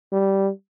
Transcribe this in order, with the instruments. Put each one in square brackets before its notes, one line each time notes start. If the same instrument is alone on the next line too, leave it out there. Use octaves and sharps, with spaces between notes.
[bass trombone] G3